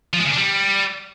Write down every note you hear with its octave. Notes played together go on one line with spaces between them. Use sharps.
F3
G#3
C#3
D4
G3